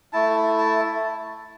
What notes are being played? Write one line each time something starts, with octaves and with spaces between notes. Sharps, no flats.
A3 E4 A5
A5